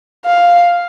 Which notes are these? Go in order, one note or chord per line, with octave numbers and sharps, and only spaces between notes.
F5